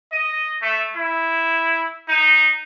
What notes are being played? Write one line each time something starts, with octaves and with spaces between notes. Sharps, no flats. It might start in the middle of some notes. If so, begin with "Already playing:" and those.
D#5
A3
E4
D#4